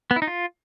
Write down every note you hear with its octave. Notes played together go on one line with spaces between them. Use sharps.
B3
E4
D#4
F4